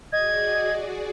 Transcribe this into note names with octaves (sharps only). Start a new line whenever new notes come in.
F#4 G#4 D5 D#5 G#6